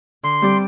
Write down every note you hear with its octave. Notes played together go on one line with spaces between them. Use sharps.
D3 C6
G3 C4 G4 D5